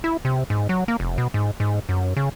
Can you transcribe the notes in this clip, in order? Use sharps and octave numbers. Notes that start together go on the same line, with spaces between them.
E4
C3
G#2
F#3
A#3
F1
B2
G#2
G#2
F#2
C#3